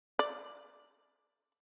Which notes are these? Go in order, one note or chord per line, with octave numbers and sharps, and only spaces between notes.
D5